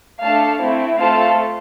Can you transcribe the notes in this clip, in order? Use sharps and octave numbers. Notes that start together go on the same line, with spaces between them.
A3 D4 A4 F5 A5
A3 C4 E4
A3 C4 F4 A4 F5 A5